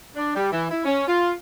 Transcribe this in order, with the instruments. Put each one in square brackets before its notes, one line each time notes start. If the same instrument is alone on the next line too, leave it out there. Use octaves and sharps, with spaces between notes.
[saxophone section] D4
G3
E3
E4
C#4
F4